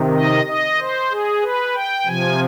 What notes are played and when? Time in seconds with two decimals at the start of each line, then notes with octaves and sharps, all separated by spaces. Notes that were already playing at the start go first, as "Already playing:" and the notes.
Already playing: C3 D#3
0.14 D#5
0.47 D#5
0.79 C5
1.10 G#4
1.42 B4
1.75 G5
2.06 C3 F3 G#5